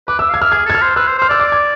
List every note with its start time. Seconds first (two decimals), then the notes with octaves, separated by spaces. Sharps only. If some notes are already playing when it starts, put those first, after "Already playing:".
0.08 B4 D6
0.19 E5 E6
0.30 F5 G#6
0.41 E5 F6
0.51 G#4 G#6
0.66 A4 G#6
0.75 F6
0.82 C5
0.96 B4 E6
1.07 C5
1.18 C5 F6
1.29 D5 E6
1.40 D6
1.52 G#6